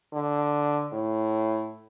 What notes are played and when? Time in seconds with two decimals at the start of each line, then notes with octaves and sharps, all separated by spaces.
0.13 D3
0.93 A2